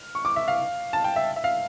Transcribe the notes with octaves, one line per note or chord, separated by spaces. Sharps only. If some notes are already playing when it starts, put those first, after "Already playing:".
Already playing: F6
C#6
D6
E5
F5
A5
G5
E5
E5
F5